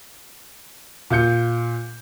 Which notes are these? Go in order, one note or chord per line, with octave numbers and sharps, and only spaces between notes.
A#2 F4 G6 C#7